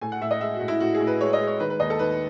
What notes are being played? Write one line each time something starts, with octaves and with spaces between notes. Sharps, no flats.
A2 G#5
F#5
A2 E5
D#5
G#3 E5
F#4
A2
E4
A2 F#4
G#4
A2
B4
G#3 C#5
D#5
G#3
C#5
D#3 B4
B4
D#2 D#5
A4
D#2 B4